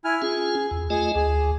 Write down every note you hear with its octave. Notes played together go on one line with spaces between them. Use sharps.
E4 G#5 F6
C#4 F4 G#4
E2
A3 F4 G#4 D#5
D2 G#4